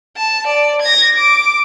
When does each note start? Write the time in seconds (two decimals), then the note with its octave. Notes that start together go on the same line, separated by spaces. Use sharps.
0.17 A5
0.47 D5
0.81 G#6 A#6
1.17 D6